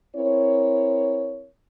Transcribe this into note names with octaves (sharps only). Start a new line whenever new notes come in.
C4 E4 A#4 C#5